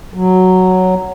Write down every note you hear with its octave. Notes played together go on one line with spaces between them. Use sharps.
F#3